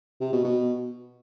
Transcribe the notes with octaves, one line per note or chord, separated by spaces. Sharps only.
C3
B2
B2